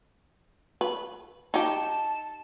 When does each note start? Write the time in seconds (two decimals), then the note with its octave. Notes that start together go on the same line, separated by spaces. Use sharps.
0.81 B4
1.54 D#4 G4 A5